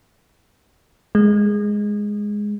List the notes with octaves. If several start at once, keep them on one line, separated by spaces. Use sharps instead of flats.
G#3